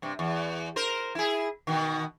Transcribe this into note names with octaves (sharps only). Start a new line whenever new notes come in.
G2 C3
E2
A#4 C5
E4 G#4
B2 D#3